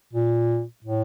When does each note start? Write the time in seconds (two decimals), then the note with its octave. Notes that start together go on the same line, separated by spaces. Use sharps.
0.14 A#2
0.84 A2